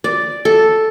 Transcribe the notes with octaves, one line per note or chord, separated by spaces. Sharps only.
D5
A4